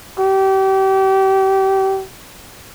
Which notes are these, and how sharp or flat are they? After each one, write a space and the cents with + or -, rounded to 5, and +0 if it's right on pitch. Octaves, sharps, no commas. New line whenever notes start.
G4 -30